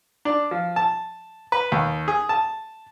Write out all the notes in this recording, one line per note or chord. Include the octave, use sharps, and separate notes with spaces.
D4
F3
A5
B4
D#2
G#4
A5